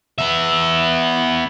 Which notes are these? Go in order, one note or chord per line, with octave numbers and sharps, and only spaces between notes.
B3 E5